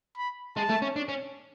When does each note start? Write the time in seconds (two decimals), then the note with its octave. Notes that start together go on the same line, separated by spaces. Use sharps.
0.17 B5
0.56 G#3 A5
0.70 A3
0.82 C#4
0.96 D4
1.09 C#4